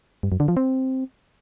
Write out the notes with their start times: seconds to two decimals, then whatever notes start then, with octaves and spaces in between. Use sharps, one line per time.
0.23 G2
0.32 F#2
0.40 D3
0.48 F3
0.57 C4